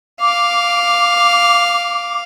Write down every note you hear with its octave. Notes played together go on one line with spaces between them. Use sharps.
F5 D6